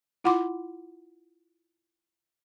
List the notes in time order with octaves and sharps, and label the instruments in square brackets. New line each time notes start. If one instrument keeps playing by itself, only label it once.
[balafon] E4 F4 F#5 B5 C6 D6